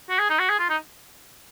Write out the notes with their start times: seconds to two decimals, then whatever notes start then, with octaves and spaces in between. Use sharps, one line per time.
0.10 F#4
0.19 G#4
0.30 D#4
0.39 F#4
0.49 G#4
0.59 F4
0.70 D#4